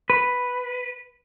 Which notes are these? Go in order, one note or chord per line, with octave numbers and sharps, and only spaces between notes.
B4